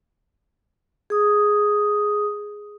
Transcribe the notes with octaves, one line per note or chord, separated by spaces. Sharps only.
G#4 D#6